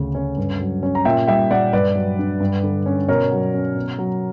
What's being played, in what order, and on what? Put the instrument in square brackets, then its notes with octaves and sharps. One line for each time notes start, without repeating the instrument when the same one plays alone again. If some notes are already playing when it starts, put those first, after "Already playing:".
Already playing: [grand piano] D2 C#3
C#4
G2
F#3
C#4
A#5
A#2 E5 G5
G3 E5 G5
A#2 D5 F#5
G2 B4 D5
F#3
D4
G2
D3
C#4
B2 A#4 C#5
F#3
C#4
B2
F#3